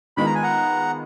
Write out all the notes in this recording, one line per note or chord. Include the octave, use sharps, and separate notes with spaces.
D#3 G#3 B3 F4 B5
A#5
G#5
F#5 A#5